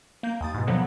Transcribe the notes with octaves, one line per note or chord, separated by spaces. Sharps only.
A#3 G6
D#2 D#6 A6
G#2 B2
B2 D3 F3 F#3 B3